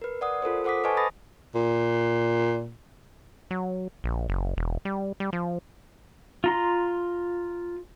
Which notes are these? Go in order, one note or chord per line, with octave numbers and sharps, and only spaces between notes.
A#4 B4
D5 F#5 D#6
F4 A4 A#4 C5
A4 C5 F#5 D6 D#6 B6
B4 C5 D#5 G#5 A5 C#6
B4 B5 D#6 A6 A#6
A#2
F#3
A#1
F#1
E1
G3
G3
F3
F4 A#5 C6